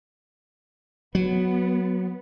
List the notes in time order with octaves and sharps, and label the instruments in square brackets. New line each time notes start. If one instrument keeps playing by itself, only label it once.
[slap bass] F#3 [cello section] B3